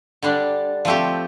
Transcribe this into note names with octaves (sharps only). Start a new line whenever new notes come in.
D3 G3 D4
F3 A3 C4 G4